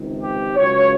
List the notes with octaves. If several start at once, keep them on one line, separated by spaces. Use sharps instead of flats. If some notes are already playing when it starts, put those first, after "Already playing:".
Already playing: C#2 C3 D#3
G4
C#2 C#3 F#3 C#5